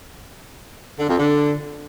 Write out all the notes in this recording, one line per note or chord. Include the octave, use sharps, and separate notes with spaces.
D3
F2
D3